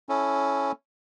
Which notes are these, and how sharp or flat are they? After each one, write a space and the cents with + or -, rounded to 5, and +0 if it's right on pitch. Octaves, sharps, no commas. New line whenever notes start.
C#4 +0 E4 +0 A4 -20